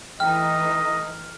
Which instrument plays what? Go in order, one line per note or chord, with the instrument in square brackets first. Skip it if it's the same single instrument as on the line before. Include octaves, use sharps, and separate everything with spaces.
[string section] E3 A3 D#4 [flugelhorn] D#5 [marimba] G5 [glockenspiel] F6